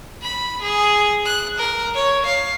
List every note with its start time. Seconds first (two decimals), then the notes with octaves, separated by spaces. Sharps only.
0.23 B5
0.63 G#4
1.26 F#6
1.59 A#4
1.95 C#5
2.26 F5